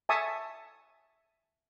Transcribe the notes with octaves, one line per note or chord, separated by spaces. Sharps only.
E5 G#5 A5 C#6 D#6